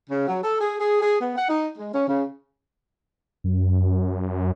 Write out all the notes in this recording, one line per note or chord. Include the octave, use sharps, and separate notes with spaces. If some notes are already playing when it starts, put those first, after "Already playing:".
C#3
F#3
A4
G#4
G#4
G#4
B3
F#5
D#4
G#3
C#4
C#3
F#2